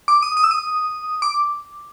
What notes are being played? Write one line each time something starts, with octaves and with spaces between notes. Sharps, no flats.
D6
D#6
D#6
E6
D#6
D6